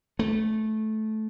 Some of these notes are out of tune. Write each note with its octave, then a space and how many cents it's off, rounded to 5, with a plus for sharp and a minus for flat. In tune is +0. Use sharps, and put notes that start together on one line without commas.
A3 -15